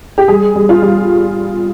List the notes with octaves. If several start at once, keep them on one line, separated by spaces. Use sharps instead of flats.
G4
G3 G#4
G3
F4
G3